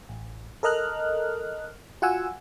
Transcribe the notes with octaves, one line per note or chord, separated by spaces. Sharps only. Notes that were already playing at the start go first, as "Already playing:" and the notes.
A1
A4 A#4 D#5 F6 F#6
F4 F#4 F#5 G#5 E6